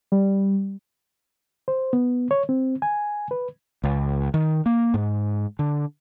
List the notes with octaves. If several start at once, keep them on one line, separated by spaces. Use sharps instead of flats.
G3
C5
B3
C#5
C4
G#5
B4
C#2
D#3
A#3
G#2
D3